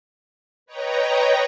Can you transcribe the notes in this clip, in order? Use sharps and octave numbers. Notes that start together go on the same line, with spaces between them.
B4 C#5 D#5 G5 A#5